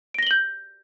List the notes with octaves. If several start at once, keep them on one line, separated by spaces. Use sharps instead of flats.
G6 A#6 D7 F#7 G7